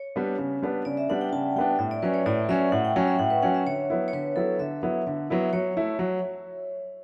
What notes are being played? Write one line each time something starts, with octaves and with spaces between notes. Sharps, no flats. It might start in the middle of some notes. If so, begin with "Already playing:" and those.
Already playing: C#5
G3 B3 D4
C#3
G3 B3 D4
C#3 D5
E5
G3 B3 D4 F#5
G5
C#3 A5
G3 B3 D4 G5
A2 E5
D5
F#3 C#4 B4
C#5
A2 D5
F#3 C#4 E5
A2 F#5
G5
F#3 C#4 G5
E5
A2 F#5
B4
F#3 C#4 F#5
E5
D3 C#5
F#3 B3 E4
C#5
D3 B4
F#3 B3 E4 A4
D3 E5
F#3 B3 E4
D3
F#3 B3 E4
F#3 C#5
A3 E4
F#3